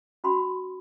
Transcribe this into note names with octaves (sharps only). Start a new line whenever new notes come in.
C#4 F#4 B5 C6